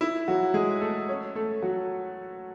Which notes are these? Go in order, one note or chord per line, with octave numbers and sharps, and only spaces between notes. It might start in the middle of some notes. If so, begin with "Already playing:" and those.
E4
F#3 F#4
G#3 G#4
A3 A4
C#4 C#5
A3 A4
F#3 F#4